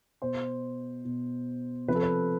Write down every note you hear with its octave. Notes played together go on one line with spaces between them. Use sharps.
B2 C5
B2
C3 F3 B4
A4
B4